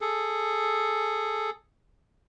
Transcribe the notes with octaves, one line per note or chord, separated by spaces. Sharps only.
G#4 A4